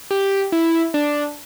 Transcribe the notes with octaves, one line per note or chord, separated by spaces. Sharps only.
G4
E4
D4